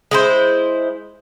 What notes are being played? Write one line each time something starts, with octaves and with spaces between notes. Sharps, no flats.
G#3 E4 C5